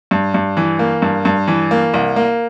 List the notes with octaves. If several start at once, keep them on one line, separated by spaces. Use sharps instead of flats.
G2
G2
E3
A#3
G2
G2
E3
A#3
C2
A#3